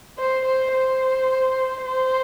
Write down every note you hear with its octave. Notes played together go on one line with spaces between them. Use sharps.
C5
C5
C5
C5